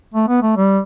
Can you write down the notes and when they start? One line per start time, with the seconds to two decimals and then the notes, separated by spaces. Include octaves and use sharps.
0.14 A3
0.28 B3
0.42 A3
0.57 G3